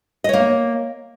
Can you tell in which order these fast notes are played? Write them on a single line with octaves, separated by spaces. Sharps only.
D#5 C#5 A#3